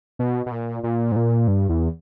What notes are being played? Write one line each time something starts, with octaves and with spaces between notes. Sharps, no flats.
B2
B2
A#2
A#2
G#2
A#2
G2
E2